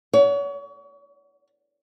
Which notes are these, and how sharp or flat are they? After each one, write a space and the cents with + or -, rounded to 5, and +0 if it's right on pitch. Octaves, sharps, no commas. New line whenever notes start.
C#5 +35 F#5 +0